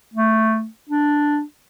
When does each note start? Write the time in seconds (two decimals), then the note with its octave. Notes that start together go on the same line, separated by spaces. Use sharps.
0.14 A3
0.90 D4